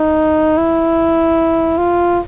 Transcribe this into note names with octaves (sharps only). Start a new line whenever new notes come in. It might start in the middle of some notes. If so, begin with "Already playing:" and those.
Already playing: D#4
E4
F4